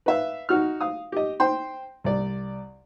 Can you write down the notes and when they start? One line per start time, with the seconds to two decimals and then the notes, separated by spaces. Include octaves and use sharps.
0.06 B4 E5 F5
0.49 D#4 F#4 F6
0.81 F5 D#6
1.12 G4 D#5
1.40 C5 G5 C6
2.04 C2 D5